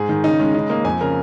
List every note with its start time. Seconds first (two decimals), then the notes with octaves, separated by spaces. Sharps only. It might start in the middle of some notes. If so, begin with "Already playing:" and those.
Already playing: G#2 G#4
0.09 D#3
0.24 C#3 D#4
0.39 G#3 C#4
0.54 C#3 D#4
0.70 A#3 D#5
0.84 F2 G#5
1.01 C#3 A#4